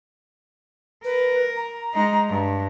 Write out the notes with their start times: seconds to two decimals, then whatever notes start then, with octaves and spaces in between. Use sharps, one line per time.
1.04 A#4 B4
1.56 A#5
1.94 G#3 D#4
2.29 G2